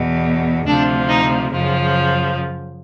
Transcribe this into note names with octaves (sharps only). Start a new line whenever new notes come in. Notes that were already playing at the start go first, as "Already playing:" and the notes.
Already playing: E2 B2
D2 C3 F3 D4
D#4
F#2 C#3 F3